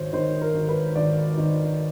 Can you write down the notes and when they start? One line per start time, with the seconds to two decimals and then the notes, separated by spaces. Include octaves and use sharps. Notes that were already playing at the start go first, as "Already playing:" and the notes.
Already playing: G#1 D#3 C5 C#5
0.13 D#3 C5
0.42 A#4
0.54 G#1
0.69 B4
0.95 G#1 D5
1.38 D#3